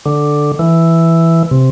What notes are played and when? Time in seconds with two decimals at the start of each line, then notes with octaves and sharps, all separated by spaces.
0.06 D3
0.59 E3
1.51 C3